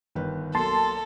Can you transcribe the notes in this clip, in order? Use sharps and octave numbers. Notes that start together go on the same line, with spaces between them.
G1 D#3 B4
B1 A#3 A4 A5 C6